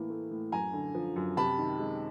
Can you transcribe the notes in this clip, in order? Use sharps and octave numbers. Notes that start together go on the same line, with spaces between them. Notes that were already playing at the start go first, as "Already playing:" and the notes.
Already playing: A2 E3 A#3
A3
A2
F#2 G#5 A#5
D3
F3
F#2
C3 A5 B5
D#3
G#3